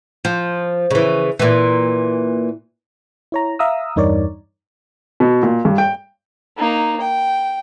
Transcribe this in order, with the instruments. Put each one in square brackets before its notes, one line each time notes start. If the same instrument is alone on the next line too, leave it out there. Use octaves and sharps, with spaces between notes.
[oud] F3
C#3 E3
A#2 E3
[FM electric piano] E4 C#5 A#5
E5 F5 A#5 D#6 E6
E2 G2 D#4 A#4 C#5 D5
[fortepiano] B2
A#2
G2
G5
[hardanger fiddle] A#3 D#4
G5